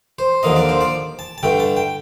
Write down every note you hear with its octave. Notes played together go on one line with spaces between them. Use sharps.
C5
D#2 D3 F3 A#3 D#5
D5
C5
D5
A5
A5
G2 D3 A3 G5
A5
G5